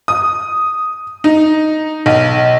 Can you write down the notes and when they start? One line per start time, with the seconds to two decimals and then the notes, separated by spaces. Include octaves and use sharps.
0.08 D#6
1.24 D#4
2.06 B1